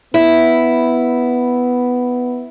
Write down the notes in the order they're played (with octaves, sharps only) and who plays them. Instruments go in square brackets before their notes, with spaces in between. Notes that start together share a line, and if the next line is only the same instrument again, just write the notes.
[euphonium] B3 [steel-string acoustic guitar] E4